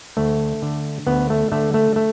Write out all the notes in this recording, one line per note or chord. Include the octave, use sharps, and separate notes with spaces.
D2 A3
D3
D2 B3
A3
D3 A3
A3
A3